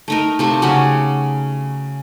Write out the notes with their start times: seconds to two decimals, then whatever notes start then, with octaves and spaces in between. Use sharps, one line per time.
0.08 A3 D#4 A#4
0.39 C3 A3 F4
0.62 C#3 F#3 G4 F#5